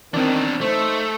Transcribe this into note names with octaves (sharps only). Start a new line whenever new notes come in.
D#3 E3 B3 C4 D4
A3 D#4 C5